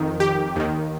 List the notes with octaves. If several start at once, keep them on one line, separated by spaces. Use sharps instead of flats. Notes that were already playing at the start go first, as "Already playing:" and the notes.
Already playing: F2 D#3
G4
D#2 D#3